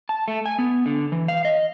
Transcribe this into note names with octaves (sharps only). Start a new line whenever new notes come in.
A5
A3
G#5
B3
D3
E3
F5
D#5